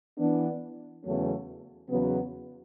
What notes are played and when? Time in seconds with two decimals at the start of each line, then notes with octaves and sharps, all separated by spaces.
0.18 E3 B3 D4
1.04 E2 C#3 F#3 A3 C#4
1.89 E2 C#3 F#3 B3